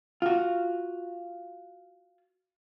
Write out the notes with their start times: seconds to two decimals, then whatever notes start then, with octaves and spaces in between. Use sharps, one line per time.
0.22 F4 F#4